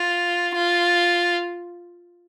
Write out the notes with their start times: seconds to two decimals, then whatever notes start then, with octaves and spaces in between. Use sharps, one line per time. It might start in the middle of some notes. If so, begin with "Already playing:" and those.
Already playing: F4
0.55 F4